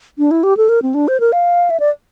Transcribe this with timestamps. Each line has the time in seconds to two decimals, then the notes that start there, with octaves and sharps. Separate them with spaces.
0.18 D4
0.31 E4
0.43 G4
0.57 A4
0.69 A#4
0.82 C4
0.94 D4
1.08 C5
1.20 A#4
1.32 F5
1.70 E5
1.80 D5